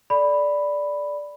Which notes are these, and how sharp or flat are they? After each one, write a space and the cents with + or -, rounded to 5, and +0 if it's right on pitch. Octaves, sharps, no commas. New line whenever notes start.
A4 -15 D5 +0 B5 +0